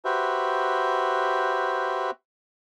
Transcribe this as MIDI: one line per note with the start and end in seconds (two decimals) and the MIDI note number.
0.05 2.11 66
0.05 2.11 67
0.05 2.11 71
0.05 2.11 72
0.05 2.11 76